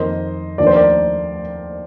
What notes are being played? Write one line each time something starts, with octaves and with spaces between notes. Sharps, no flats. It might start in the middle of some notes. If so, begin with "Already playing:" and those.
Already playing: F2 D#3 A#3 C5 D#5
D#2 D3 F3 A#3 D5
C5
A#4 D5